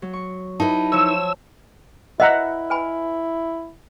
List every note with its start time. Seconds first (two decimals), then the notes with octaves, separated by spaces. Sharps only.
0.02 F#3
0.13 C#6
0.60 D#4 E4 B4 A5
0.92 F3 C#5 E6
2.20 E4 B4 D#5 E5 F#5 A#5
2.70 B4 G#5 B5